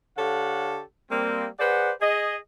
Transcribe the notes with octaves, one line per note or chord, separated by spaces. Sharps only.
D3 G4 A4 C#5 F5 F#5
G3 A#3 C4
G#4 B4 C5 D5 F#5
G#4 D#5